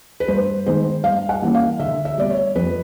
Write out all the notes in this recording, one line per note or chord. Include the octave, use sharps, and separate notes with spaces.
B4
G2 C5
D#3 G#3 B3 C5
G2 F5
F#5
E3 G3 A#3 C#4
F5
D3 E5
E5
G3 B3 D5
C#5
F2 B4